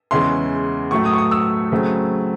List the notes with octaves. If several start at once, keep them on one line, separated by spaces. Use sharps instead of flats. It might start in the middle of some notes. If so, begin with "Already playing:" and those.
E2 C#3 G#3 C#4 E4 C6
A2 F#3 A3 C#6
D#6
C#6
D#6
E6
C#3 F#3 A3 C4